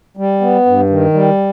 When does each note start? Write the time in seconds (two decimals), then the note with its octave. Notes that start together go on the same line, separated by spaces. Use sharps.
0.17 G3
0.41 B3
0.66 G2
0.90 D#3
1.14 G3